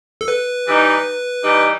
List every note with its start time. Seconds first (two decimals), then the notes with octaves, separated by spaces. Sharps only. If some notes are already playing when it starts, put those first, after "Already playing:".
0.21 A4
0.28 B4
0.67 E3 G3 D#4
1.43 E3 G3 D#4